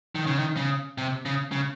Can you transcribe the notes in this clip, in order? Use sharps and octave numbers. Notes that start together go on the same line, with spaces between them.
D#3
C#3
D#3
C#3
C3
C#3
C#3